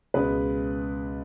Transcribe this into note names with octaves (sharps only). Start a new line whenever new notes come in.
C#2 B2 G#3 B4